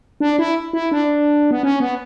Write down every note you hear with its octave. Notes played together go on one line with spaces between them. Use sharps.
D4
E4
E4
D4
B3
C#4
B3